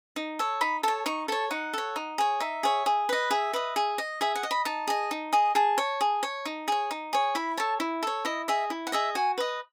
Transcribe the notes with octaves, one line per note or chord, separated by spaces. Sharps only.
D#4
A4 C#5
D#4 B5
A4 C#5 A5
D#4 C#6
A4 C#5 A5
D#4 F#5
A4 C#5
D#4
G#4 C#5
D#4 E5
G#4 C#5
G#4
B4 D#5
G#4 E5
B4 D#5
G#4
D#5
G#4 E5
F#5
D#5
B5
D#4 A5
G#4 D#5
D#4
G#4 D#5
G#4 A5
C#5
G#4
C#5
D#4
G#4 C#5
D#4
G#4 C#5
E4 B5
A4 C#5 A5
E4
A4 C#5
E4 D#5
G#4 D#5 E5
E4
F#5
G#4 D#5 E5
F#4 G#5
B4 D#5